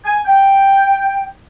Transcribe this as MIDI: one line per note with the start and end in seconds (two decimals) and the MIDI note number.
0.05 0.18 80
0.26 1.26 79